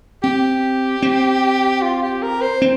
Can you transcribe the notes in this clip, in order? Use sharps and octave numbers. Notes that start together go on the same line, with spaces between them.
C4 G4
C4
F4
G4
A#4
C5
C4